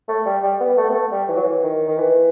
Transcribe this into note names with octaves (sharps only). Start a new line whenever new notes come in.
A3
G3
G3
B3
A3
B3
A3
G3
E3
F#3
E3
D#3
D#3
E3